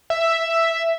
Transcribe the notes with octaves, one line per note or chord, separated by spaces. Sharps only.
E5